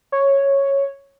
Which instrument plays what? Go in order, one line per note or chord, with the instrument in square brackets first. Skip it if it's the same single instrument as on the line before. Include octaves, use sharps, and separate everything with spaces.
[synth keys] C#5